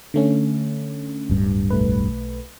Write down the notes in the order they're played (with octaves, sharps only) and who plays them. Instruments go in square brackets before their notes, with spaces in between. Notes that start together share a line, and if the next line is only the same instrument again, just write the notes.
[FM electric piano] D3 A3 C#4
[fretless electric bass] D1 G2
[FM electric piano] B1 A3 B4